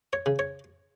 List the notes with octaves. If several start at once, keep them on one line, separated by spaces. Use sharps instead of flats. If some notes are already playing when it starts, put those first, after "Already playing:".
C#5
C#3
C#5